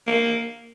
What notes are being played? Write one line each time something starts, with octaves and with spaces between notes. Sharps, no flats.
A#3